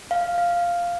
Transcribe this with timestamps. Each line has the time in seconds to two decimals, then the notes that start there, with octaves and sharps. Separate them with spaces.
0.11 F5
0.38 F5